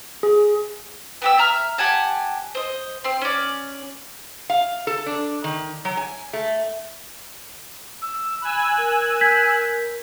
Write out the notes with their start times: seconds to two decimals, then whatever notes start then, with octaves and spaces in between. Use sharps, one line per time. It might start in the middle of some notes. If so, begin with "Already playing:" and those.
0.23 G#4
1.22 B3 G4 E6
1.38 E5 A#5 F6
1.78 G4 F#5 G#5 A5
2.55 C5 D#5
3.04 C4 C6
3.21 C#4 D5
4.50 F5
4.87 A4
5.06 D4
5.44 D#3
5.85 F#3
5.97 G#5
6.33 A3
8.02 E6
8.42 G#5 B5 E6 F#6
8.78 A#4
9.21 G6 G#6 B6